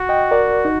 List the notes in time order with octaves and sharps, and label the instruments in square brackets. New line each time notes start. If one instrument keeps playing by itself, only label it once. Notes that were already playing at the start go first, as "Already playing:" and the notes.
Already playing: [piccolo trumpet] F#4
[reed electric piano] D#5 G5
A#4 D5
D#4